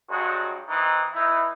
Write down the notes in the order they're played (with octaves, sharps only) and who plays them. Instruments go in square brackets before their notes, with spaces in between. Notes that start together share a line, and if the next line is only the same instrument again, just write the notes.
[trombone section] G2 F#3 G#3 F#4
E3 C4 D#4
E3 D#4 E4